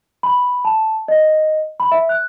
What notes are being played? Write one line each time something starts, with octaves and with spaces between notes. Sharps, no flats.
B5
A5
D#5
B5
E5
F#6